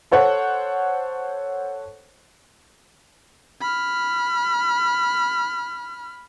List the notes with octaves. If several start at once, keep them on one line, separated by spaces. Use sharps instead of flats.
A4 C5 C#5 F#5
B5 F6